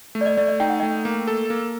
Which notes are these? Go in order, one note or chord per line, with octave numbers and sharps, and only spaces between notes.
A3
D5
D#5
A3 D5
D#5
D#4 G5
F#5
A3 D#5 G5
A#3
A4
A#3